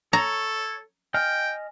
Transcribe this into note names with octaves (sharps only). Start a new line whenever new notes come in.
A4 C#5 A#5
D#5 G5 G#5 F6